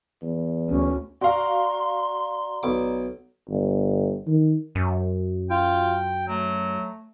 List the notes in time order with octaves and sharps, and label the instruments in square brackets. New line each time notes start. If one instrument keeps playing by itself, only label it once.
[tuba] E2
[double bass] D2 [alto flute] C#4
[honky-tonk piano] F#4 F5 [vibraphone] D5 A#5 [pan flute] C6
[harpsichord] B1 D6
[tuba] G1
D#3
[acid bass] F#2
[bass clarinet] F4 [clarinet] G5
[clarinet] F#3 [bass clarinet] A3